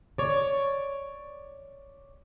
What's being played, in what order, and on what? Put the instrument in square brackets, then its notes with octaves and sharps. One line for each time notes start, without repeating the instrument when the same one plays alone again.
[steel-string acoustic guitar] C#5 D5